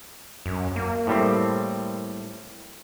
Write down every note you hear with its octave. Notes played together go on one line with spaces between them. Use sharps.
F#2
A#3
A2 G3 C4